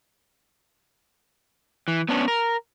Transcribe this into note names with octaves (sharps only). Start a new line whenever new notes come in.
E3
B3 C#4 D4
A#4